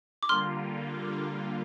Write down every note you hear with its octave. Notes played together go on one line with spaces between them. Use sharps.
D6
D3 G3 A#3 F4 C6 F6